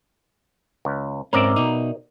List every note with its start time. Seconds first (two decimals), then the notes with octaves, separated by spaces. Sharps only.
0.85 C#2
1.33 G#2 C4 C#4 A#4 D5 E5
1.56 B2 D#4